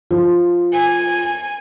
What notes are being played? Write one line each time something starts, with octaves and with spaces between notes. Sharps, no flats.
F3
G#5